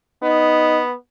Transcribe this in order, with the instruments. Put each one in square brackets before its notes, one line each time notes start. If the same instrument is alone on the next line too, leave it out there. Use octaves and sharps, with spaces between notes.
[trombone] B3 [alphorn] D#4